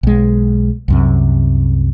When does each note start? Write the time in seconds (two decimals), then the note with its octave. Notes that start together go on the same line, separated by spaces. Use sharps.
0.03 B1 G#3
0.88 C2 F#2 C3